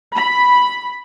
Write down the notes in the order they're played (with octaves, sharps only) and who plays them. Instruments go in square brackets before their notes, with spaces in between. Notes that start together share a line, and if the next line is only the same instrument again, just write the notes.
[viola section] B5